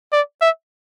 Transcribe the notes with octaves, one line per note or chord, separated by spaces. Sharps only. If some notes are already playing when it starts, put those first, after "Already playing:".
D5
E5